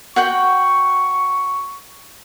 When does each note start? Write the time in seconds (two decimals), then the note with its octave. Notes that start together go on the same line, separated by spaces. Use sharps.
0.16 F#4 F#5 G5 C#6